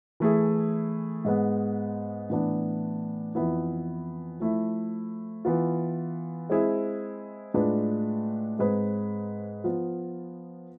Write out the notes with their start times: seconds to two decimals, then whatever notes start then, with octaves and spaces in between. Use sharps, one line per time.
0.20 E3 A3 E4 G#4
1.25 G#2 G#3 B3
2.30 A2 E3 B3 D4
3.35 F2 E3 B3 E4
4.40 F3 A3 E4
5.45 E3 B3 F4
6.50 G#3 C4 E4 G#4
7.54 A2 G#3 D4 F4 B4
8.59 G#2 G#3 C4 G#4 B4
9.64 F3 B3 F4